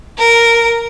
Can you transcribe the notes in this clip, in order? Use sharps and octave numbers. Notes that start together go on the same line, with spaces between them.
A#4